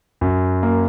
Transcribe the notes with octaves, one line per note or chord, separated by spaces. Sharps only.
F#2
A#3